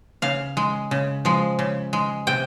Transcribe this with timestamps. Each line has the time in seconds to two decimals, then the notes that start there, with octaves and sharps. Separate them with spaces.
0.22 C#3 F5
0.57 G#3
0.91 C#3
1.25 F3 G#3
1.59 C#3
1.93 G#3
2.27 C3 G5